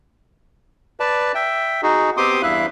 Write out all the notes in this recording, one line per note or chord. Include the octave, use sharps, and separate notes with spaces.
B4 D5 A5
E5 G5
D#4 F#4 G#4
B3 C4 G4 C6 D6 D#6
E2 G2 E4 E5 F5 F#6